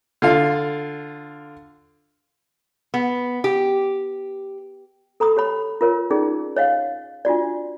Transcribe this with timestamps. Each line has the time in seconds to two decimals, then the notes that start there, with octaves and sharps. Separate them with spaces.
0.22 D3 F4 F5
2.94 B3
3.44 G4
5.20 A4 A#5 B5 D#6
5.36 G4 C#5 B5
5.81 F4 A#4 C#5
6.10 C#4 D#4 F4 G#4 D5
6.56 C#5 D#5 F5 F#5
7.25 D4 F4 F#4 D5